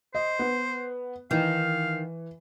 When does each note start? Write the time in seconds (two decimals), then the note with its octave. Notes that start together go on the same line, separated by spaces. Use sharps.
0.15 C5 D#5
0.39 B3
1.31 D#3 E3 F5